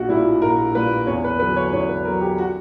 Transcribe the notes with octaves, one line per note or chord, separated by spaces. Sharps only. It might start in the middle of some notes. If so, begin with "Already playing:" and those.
Already playing: A#1 F#4
A#2 G3 E4
A#1 A#4
A#2 G3 B4
E2 C#5
B4
D3 F#3 B4
C#5
E2 C#5
B4
D3 F#3 A#4
G4
F#4